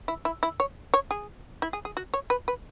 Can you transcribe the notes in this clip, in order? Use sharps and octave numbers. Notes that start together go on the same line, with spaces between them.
E4
E4
E4
C#5
C#5
G#4
E4
G#4
G#4
F#4
C#5
B4
B4